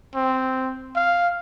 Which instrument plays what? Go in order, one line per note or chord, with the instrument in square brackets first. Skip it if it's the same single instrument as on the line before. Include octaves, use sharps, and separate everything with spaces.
[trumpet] C4
F5